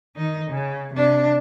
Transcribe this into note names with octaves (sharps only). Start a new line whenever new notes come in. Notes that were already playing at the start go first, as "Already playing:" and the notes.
D#3 D#4
C#3
C3 D4